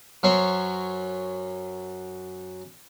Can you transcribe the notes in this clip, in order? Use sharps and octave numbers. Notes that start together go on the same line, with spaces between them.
F#2 F#3 C5 C#5